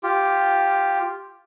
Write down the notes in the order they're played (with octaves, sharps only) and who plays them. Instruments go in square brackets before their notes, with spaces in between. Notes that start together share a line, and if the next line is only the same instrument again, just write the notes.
[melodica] F4 G4